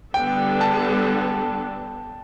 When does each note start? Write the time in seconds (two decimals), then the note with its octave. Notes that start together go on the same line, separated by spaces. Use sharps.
0.14 D3 G3 B3 D4 A4 G5
0.61 A5